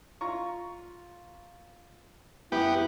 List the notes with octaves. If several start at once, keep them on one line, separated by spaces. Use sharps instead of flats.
F4 A#5 C#6
F#2 B3 E4 G4